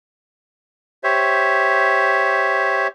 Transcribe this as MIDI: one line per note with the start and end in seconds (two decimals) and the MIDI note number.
1.04 2.87 67
1.04 2.87 72
1.04 2.87 73
1.04 2.87 76